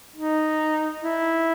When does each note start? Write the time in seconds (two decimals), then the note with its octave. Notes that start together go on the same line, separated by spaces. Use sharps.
0.16 D#4
1.01 E4